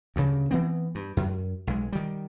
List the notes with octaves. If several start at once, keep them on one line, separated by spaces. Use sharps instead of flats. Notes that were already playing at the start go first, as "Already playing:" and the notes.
D2 G2 C#3
E3 B3 C4
G2
F#2
B1 G#3
D#3 G3